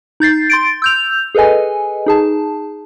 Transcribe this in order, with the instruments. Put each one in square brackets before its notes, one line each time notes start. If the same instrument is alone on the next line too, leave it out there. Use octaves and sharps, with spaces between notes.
[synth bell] D#4 G6 A6 C7
C6 A6 D7
E6 G6 F7
G#4 A4 B4 D#5 G#5
D#4 G#4 A5